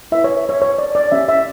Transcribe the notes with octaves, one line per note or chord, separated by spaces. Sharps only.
E4 B4 E5
C#5
C#5
C#5
D5
D5
C#4 G4 C#5 E5
E5